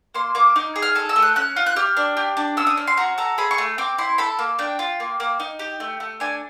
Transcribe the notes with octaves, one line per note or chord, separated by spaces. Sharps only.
A#3 C6
A#3 D6
D#4 D6
G#4
F6
A4 F6
E6
A3
F#6
C#4 F#6
F4
F#6
G4 F6
D4
G4
D4
C#4 E6
D#6
C#4
C6
F#4 A#5
A4 A#5
G#4 B5
C#6
A3
C4 D6
E4 C6
A4 B5
A#3
D4 G5
F4
A#3
A#3
D#4
G4
A3
A3
D4 G#5